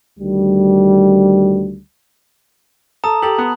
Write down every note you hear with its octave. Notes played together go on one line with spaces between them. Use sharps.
D2 D#3 G3
A4 A5 A#5 D#6
G4 A4 F#7
B3